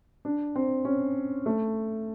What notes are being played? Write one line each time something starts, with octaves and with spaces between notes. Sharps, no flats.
D4
C4
C#4
A3